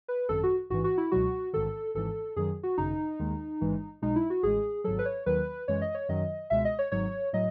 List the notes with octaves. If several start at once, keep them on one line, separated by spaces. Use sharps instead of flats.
B4
G#1 F#2 D#3 A4
F#4
A1 G#2 E3 F#4
F#4
E4
C#2 B2 F#3 F#4
A1 G#2 D#3 A4
G#1 G#2 E3 A4
F#2 D#3 F#3 G#4
F#4
G#1 F#2 C#3 D#4
D#2 D#3 G#3
A1 G#2 E3 G#3
B1 B2 G#3 D#4
E4
F#4
A1 A2 G#3 G#4
G#1 G#2 F#3 A4
B4
C#5
D#2 D#3 F#3 B4
F#2 E3 G#3 C#5
D#5
C#5
F#2 D#3 F#3 D#5
C#2 B2 G#3 E5
D#5
C#5
G#1 G#2 F#3 C#5
A2 F#3 D#5